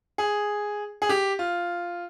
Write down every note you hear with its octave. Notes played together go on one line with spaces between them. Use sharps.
G#4
G#4
G4
F4